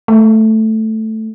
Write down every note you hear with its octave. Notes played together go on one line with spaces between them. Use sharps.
A3